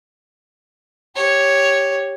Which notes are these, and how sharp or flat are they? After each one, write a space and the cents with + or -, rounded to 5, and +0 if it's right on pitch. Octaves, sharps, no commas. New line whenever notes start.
G4 +0 C#5 +0